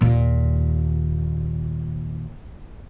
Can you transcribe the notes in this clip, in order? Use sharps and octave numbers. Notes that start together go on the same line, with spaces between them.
D#2 A#2